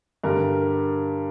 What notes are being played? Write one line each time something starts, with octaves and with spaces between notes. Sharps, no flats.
G2 D3 G3 A#4